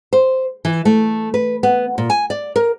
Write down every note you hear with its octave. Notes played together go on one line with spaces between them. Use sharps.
C5
E3
A3
B4
B3
A#2
G#5
D5
A#4